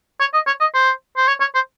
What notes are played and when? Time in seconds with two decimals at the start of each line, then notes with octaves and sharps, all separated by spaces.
0.20 C#5
0.34 D#5
0.47 C#5
0.60 D#5
0.74 C5
1.17 C5
1.28 C#5
1.40 C#5
1.55 C5